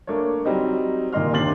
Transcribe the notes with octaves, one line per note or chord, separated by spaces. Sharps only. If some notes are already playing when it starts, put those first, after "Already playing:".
A3 A#3 D4 C#5
F#3 G3 C4 D#4
A#2 D#3 D#5 C6 F6
D#2 C3 D4 C6 A6 F#7